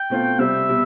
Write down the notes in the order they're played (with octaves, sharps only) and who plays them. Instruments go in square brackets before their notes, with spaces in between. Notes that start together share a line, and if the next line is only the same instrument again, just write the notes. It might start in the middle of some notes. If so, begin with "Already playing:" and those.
Already playing: [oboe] G5
[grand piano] B2 A3 C4 F4
[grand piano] C3 G3 C4 [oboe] E5
[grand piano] B2 G3